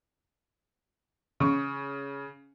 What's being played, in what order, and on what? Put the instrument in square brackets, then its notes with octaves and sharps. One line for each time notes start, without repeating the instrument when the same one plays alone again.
[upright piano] C#3 C#6